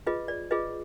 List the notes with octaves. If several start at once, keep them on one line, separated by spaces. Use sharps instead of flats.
F4 G#4 B4 D#5
D5
F4 G#4 B4 D#5